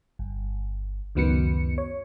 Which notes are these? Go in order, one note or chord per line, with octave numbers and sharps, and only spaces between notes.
G1
C#2 F#2 D#3 B3 F#4 C#7
C#5